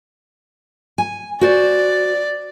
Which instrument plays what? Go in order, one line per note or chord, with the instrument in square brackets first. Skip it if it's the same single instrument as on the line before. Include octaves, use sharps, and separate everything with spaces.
[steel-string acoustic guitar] G#5
[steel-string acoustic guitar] F#4 C5 [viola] D5